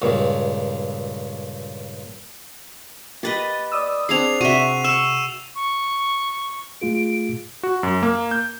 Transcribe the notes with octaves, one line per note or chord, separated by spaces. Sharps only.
C#2 G2 A#2
A#3 G4 B4 D#5 A6
D5 D#6 E6
C4 D4 G#4 C7 F7
C3 F#4 E5 D#7
C#6 E6 E7
C#6
A3 F4 G#4 D7
F#4
F#2
A#3
G6